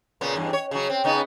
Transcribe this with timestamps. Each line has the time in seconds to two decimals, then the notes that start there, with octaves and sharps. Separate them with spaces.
0.21 A#2 C#3 B3
0.36 E2 G2
0.53 C#5
0.71 C#3 F#3
0.90 C4
1.04 C#3 B3 D#4